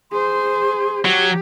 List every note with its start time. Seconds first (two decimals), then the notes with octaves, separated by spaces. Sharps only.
0.12 G#4 C5 C6
1.05 F#3 G4